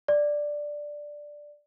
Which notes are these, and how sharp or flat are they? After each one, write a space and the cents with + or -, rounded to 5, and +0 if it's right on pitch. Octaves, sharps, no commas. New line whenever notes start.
D5 +5